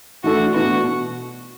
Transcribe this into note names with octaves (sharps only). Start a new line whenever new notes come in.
E3 A3 D4 F#4 A4
A2 E3 B3 D4 F#4 B4
B2